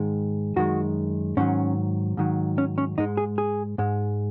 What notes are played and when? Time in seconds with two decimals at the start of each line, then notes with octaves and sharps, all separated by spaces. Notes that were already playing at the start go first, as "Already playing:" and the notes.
Already playing: G#2 D#3 G#3
0.56 F#2 D#3 G#3 F#4
1.37 G#2 D#3 F#3 C#4
2.17 G#2 D#3 F#3
2.58 C#4
2.78 C#4
2.98 G#2 G#3 D#4
3.17 G#4
3.38 G#4
3.78 G#2 G#3